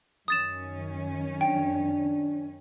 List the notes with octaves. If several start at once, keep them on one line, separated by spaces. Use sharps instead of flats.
F#2 D#3 C#4 D#6 A6 E7
D4 G5